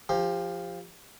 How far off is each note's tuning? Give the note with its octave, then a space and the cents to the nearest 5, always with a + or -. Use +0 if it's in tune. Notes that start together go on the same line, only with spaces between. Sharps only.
F3 +0 G4 +30